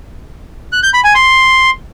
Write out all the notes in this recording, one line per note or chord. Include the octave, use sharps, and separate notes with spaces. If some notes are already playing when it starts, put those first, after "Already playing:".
F#6
G6
B5
G#5
C6